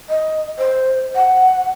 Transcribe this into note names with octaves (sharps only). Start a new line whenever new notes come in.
D#5
C5
F#5